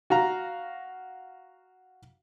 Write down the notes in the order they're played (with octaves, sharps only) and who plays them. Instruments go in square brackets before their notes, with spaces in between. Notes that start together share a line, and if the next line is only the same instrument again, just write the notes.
[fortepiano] F#4 F5 A#5